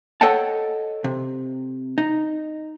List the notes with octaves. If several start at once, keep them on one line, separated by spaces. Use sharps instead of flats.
A4 C#5 D#5 F#5 G5 A5
C3
D#4